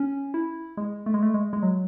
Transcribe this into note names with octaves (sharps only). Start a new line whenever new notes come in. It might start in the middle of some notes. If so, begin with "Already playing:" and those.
Already playing: C#4
E4
G#3
A3
G#3
A3
G#3
G#3
F#3